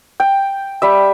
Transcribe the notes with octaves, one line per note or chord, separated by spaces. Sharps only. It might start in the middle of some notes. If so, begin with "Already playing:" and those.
G5
G3 E5